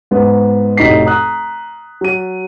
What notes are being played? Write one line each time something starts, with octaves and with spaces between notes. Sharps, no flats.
G#2 B3
F1 A2 D#4 F#4 B6 C7
A#5 D#6 F#6
F#3 D#7